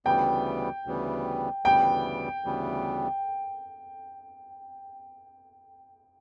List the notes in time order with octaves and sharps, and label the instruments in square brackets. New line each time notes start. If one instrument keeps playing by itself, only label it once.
[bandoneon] D2 C#3 E3 G3 B3 [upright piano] G5
[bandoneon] D2 C#3 E3 G3 B3
[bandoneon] D2 C#3 E3 G3 B3 [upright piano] G5
[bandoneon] D2 C#3 E3 G3 B3